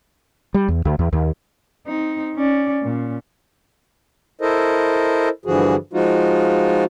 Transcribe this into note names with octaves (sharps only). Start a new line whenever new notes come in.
G3
E2
D2
E2
D#2
C4 D#4
C#4 D5
A#2 C#4
E4 A4 A#4 C5 D#5
G2 D3 E3 F3 F#4 G#4
F3 G#3 D#4 F4 F#4